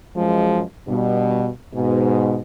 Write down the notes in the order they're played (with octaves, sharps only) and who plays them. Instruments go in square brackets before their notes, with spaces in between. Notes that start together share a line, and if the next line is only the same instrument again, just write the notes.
[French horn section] F#2 F3 G#3
G2 B2
G#2 B2